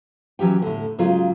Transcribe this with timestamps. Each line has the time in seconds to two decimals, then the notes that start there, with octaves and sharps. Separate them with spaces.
0.39 E3 F#3 C#4 G4 G5
0.62 A2 D3
0.99 G#2 C#3 F#3 G#3 F4